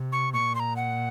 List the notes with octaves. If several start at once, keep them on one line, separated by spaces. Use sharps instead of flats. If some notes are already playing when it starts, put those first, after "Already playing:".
Already playing: C3
C#6
A#2 C#6
C6
A#5
F#5